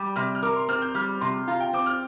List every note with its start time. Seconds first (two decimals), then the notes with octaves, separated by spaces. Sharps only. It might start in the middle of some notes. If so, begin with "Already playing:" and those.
Already playing: G3 G5 D6
0.16 C3 F6
0.35 F6
0.43 A#4 D6
0.56 C6
0.68 C4 F6
0.82 G6
0.94 G3 F6
1.21 C3 C6
1.48 F4 A#5
1.60 G5
1.73 C4 D6
1.86 F6